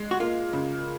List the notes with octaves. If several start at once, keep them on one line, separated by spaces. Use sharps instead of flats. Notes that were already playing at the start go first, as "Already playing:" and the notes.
Already playing: G#3
F#4
A#3 F4
C#3